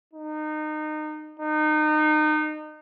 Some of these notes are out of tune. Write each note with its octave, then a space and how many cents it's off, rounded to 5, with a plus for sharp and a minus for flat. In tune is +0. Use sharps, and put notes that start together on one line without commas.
D#4 -25
D#4 -30